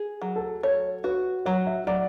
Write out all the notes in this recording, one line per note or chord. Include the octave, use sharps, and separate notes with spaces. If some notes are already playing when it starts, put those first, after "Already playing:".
Already playing: G#4
F#3
A4
A4 C#5
F#4 B4
F#3 C#5
E5
F#3 D5